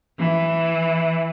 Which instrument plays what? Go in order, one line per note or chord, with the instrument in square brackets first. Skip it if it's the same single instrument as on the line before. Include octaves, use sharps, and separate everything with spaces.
[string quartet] E3